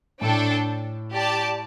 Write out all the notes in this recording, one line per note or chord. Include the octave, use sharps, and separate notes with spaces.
A2 D4 A4 G5
G4 D5 A5